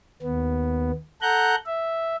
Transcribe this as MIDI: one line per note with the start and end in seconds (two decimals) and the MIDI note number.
0.22 0.91 39
0.22 0.91 59
1.22 1.55 69
1.22 1.55 78
1.22 1.55 82
1.22 1.55 90
1.22 1.55 91
1.66 2.16 76